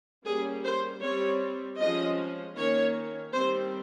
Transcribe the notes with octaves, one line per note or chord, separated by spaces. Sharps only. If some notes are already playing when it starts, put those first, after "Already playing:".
G3 A#3 C#4 G#4
C5
G3 C4 C#5
F3 G#3 C#4 D#5
D#3 A#3 C#4 C#5
D#3 G3 C4 C5